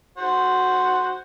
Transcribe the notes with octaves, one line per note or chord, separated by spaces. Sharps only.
F#4 C5 F#5